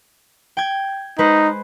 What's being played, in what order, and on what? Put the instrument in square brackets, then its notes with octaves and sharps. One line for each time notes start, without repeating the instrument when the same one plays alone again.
[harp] G5 G#6
[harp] G#3 B4 C5 [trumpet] D#4